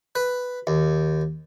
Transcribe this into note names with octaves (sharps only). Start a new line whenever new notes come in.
B4
D#2